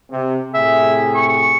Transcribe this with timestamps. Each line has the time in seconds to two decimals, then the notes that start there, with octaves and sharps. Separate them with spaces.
0.10 C3
0.54 A2 C3 G#4 E5
1.14 C#6